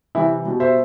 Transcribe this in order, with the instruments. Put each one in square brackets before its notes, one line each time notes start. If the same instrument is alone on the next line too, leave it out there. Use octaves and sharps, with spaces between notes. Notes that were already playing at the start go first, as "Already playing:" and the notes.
[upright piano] C3 E3 G3 E4
B2 G3
C5 E5